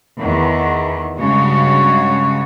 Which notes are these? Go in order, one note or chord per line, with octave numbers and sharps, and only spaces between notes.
E2 D#3
G2 C#3 G#3 F#4 C#5